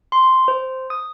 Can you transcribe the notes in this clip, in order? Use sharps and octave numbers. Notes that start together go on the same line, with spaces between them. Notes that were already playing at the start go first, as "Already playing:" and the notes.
C6
C5
D#6